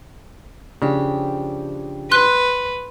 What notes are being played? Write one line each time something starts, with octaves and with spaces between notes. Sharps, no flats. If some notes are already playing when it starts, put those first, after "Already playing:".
C#3 F3 D4 G4
B4 C6 F#6